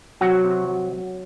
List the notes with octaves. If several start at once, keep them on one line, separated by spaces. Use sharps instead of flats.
C3 F#3 F#4
C3
F#3
F#3